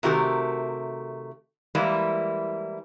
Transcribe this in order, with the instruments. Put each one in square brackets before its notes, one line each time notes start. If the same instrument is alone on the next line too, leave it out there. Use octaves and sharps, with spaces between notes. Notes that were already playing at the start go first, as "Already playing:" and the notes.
[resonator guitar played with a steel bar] C3 D#3 A3 F#4 G4 A#4
E3 G3 G#3 A#3 E4